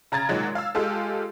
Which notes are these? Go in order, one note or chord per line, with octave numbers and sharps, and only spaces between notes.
C#3 A#5 G#6 A6
A#2 D#3 F#3 G#3
F5 E6
G#3 F4 G4 A4